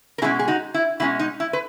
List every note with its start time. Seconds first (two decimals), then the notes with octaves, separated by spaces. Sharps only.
0.18 A#4
0.22 B2 G#3 C#4 E4 G#4
0.39 G#4
0.48 D#4 F#4
0.74 E4
1.00 B2 G#3 C#4 E4
1.20 D#4
1.40 E4
1.53 B4